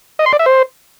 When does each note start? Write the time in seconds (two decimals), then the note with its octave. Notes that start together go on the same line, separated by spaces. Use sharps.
0.19 D#5
0.26 C6
0.33 D5
0.39 E5
0.46 C5